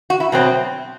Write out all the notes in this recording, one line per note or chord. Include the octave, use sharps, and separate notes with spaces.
F#4
E4
B2 F#3 C4